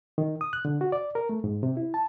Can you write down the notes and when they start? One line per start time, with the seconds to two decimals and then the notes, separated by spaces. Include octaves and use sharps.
0.18 D#3
0.41 D#6
0.53 F#6
0.65 D3
0.81 F#4
0.92 D5
1.15 A#4
1.29 A3
1.44 G#2
1.63 C3
1.77 E4
1.94 A5